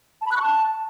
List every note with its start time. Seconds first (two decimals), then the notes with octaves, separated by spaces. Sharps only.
0.21 A5
0.26 B5
0.31 F#6
0.37 C#6
0.42 A5